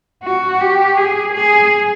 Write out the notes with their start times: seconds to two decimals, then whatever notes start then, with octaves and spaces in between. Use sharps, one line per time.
0.23 F#4
0.61 G4
0.97 G#4
1.33 G#4